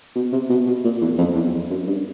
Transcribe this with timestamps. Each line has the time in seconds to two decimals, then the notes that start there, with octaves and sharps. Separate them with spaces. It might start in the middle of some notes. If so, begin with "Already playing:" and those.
0.16 B2
0.32 C3
0.50 B2
0.67 B2
0.84 A#2
1.01 E2
1.18 F2
1.35 E2
1.53 F2
1.70 F#2
1.87 G2